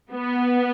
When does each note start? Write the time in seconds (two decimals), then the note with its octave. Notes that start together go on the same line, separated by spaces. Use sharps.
0.13 B3